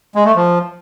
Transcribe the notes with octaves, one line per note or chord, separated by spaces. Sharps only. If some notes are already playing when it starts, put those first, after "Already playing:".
G#3
A3
F3